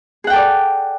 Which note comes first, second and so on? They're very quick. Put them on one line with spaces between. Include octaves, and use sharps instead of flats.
G#4 F#5 G5 A4 D5